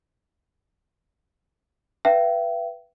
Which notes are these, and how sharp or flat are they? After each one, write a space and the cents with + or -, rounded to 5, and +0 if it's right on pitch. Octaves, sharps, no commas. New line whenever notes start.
B4 +0 E5 +35 G5 -35